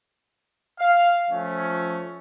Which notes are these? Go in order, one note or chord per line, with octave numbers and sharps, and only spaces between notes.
F5
F3 A3 C#4